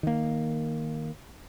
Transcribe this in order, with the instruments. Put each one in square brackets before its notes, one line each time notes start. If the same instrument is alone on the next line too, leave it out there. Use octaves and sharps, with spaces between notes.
[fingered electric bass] D#3 A#3